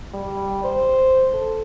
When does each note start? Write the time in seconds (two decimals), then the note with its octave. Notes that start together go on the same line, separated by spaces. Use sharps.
0.14 G3
0.64 C5
1.33 A4